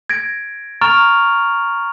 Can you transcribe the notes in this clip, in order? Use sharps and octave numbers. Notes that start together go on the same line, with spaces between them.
G#6 A#6 D7
A#5 C#6 F6 A6 D7 F7